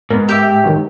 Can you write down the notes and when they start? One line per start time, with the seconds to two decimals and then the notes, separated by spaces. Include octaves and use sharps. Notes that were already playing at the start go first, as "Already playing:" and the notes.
0.10 G#2 B3 A#4
0.29 G4 E5 D6 E6
0.64 D#3 E3 F#3